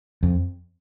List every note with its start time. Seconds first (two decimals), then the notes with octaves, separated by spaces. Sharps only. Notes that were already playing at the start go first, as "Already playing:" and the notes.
0.23 F2